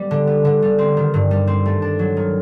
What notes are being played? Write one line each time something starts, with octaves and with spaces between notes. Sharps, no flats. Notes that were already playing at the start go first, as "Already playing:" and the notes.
Already playing: G3 B3
D3
B3
D3
G3
C4
D#3
G2
G3
C4
A3
D4
F#3
D#3